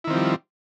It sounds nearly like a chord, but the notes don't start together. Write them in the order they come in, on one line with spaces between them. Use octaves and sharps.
E4 D#3 C4 F3 G3